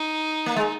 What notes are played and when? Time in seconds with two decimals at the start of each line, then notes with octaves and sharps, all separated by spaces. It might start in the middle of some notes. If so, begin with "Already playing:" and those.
Already playing: D#4
0.46 A#3
0.56 G#3